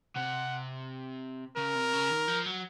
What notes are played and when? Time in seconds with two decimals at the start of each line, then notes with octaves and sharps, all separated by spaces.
0.16 C3 F#5
1.57 C#3 A#4
1.75 C3
1.93 C#3
2.10 D#3
2.27 F3
2.46 F#3